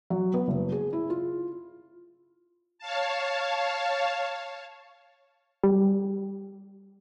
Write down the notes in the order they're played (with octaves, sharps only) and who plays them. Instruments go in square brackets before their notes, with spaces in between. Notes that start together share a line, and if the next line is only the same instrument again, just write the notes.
[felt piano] F#3
B3
F#1
G#4
E4
F4
[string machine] C#5 F5 A5
[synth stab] G3